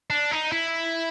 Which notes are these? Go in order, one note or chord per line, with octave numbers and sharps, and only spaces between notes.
D4
D#4
E4